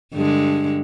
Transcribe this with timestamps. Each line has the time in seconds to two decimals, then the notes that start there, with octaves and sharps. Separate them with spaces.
0.13 G2 D3 G#3